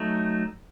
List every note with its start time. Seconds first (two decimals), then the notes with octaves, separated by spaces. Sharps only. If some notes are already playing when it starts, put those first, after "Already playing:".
Already playing: F#3 A3 D#4